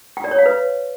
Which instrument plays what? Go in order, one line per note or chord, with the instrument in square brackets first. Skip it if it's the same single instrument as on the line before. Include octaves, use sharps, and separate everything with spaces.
[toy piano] G5
D5
C#5
F5
B4